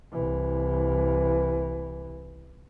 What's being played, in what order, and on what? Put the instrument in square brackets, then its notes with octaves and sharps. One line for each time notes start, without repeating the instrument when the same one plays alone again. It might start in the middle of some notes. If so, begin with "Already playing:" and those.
[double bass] C2 E3